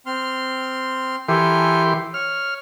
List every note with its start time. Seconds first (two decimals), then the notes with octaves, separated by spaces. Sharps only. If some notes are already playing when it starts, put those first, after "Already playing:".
0.06 C4 C6 F6
1.28 E3 G4 A4 A#4 G#5 C6
2.14 C#5 F6